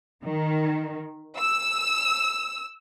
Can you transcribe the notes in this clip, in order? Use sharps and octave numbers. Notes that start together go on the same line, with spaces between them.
D#3
E6